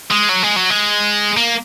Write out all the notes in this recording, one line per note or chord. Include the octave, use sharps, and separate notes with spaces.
G#3
F#3
G#3
F#3
G#3
A#3